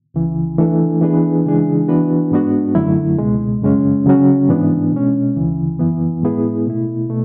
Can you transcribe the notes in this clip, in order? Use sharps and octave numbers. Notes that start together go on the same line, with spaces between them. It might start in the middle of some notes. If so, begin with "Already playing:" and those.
C#2 C#3 E3
E3 A3 D4 A4
E3 B3 D4 G#4 B4
C#3 E3 G#3 D4 G#4
E3 B3 D4 F#4 B4
G#2 G#3 B3 D4 F#4
F#2 D3 F#3 A3 E4
C#2 B2 G#3
F#2 C#3 G#3 C#4
C#3 F#3 C#4 F#4
G#2 E3 B3 D4
B2 G#3 C#4
D2 C#3 E3
F#2 E3 B3
A2 G#3 B3 E4 G#4
B2 A3 E4
B2 A3